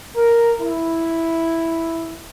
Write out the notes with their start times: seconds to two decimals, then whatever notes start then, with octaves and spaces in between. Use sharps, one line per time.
0.16 A#4
0.60 E4